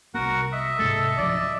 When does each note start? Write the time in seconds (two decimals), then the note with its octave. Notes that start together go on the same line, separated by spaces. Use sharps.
0.14 C2 B3 F#4 A#4 F#5
0.52 D#5 E5
0.79 G#2 C3 G#3 A4
1.18 C#2 F3 F#3 D5